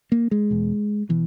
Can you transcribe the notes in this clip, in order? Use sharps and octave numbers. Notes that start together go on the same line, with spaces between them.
A#3
G#3
E2 B2
B2 E3